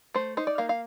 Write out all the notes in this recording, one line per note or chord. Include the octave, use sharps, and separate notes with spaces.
A3 C5
D#4 C5
D5
A#3 F5
F5